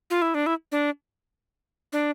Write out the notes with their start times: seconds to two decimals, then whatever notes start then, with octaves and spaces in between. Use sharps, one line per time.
0.10 F4
0.22 E4
0.34 D4
0.46 E4
0.72 D4
1.92 D4